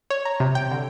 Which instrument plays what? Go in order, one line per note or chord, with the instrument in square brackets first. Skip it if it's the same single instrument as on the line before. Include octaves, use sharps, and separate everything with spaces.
[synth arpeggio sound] C#5
A#5
C3
G5
D3